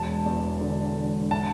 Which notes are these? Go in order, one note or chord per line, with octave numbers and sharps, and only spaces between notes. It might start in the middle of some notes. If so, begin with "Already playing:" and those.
Already playing: E1 A5
E2
D3
E1
A5